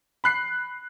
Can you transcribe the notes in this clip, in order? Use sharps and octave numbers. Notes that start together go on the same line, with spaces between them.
B5 F#6 C7